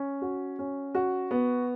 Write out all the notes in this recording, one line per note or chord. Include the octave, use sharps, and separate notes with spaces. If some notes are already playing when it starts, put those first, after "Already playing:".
Already playing: C#4
F#4
C#4
F#4
B3